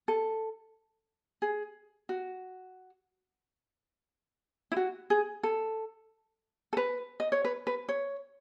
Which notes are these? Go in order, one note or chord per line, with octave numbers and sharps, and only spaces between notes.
A4
G#4
F#4
E4
F#4
G#4
A4
A4
B4
D#5
C#5
B4
B4
C#5